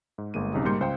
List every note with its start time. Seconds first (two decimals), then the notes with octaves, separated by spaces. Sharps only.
0.18 G#2
0.34 G1 G#3 A#3 D#7
0.53 B1 C#3 C4 D#4 G4 D#6
0.65 G#2 G3 A#3 C6 G6 C#7
0.81 C#2 C5 F5 G5